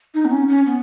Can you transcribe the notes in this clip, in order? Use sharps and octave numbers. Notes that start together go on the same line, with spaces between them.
D#4
B3
C#4
C#4
B3